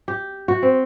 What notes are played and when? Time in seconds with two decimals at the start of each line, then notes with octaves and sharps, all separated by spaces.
0.08 G4
0.48 F#4
0.63 C4